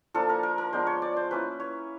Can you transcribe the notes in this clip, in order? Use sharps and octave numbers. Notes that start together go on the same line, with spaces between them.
F3 A#3 D4 F4 A4
A#4
A#4
A#4
F3 G#3 B3 D4 C5
C#5
D5
C5
A#3 C#4 E4 B4
C#5